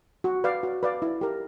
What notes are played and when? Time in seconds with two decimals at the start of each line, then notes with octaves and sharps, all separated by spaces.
0.24 F#4
0.44 B4 D5 F5
0.63 F#4
0.83 B4 D5 F5
1.02 E4
1.21 G4 A#4